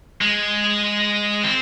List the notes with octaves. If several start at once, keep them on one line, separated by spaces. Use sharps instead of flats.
G#3
C4